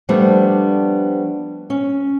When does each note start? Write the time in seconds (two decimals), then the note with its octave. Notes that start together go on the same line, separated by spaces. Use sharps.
0.09 F3 G3 A3 B3 D4
1.70 C#4